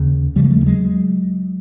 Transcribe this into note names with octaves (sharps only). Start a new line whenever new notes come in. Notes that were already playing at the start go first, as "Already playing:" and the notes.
Already playing: D#2 C#3
D#2 C#3 F3 G3
G#3
G3 A3
G3
F#3 G#3